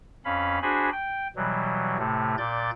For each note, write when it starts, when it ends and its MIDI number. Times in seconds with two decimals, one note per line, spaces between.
0.25 0.59 41
0.25 0.59 61
0.25 0.59 77
0.25 0.59 83
0.62 0.90 62
0.62 0.90 66
0.62 0.90 68
0.62 0.90 72
0.62 0.90 80
0.62 0.90 83
0.92 1.28 79
1.36 1.97 47
1.36 1.97 52
1.36 1.97 54
1.36 1.97 55
1.98 2.35 45
1.98 2.35 48
1.98 2.35 57
2.38 2.71 46
2.38 2.71 74
2.38 2.71 91
2.38 2.71 93